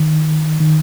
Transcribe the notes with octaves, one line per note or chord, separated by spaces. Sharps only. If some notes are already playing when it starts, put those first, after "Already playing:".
Already playing: D#3
D#3